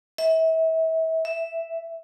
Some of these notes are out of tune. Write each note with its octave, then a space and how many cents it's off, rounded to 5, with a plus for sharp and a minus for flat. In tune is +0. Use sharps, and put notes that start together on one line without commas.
E5 -35
E5 +0